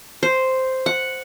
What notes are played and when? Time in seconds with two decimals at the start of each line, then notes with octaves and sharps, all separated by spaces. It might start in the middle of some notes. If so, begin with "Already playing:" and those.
0.23 C5
0.86 F#5